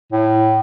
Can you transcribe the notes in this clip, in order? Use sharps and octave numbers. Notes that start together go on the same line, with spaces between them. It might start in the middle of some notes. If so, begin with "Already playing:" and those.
A2